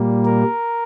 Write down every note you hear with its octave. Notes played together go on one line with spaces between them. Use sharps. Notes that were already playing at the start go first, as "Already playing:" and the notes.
Already playing: A#2 G3 A#3
A#4